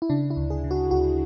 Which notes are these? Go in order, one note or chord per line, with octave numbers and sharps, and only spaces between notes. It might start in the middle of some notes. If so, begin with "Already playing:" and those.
E4
C#3 D4
E4
D2
G#4
C#3
F#4
D2 F#4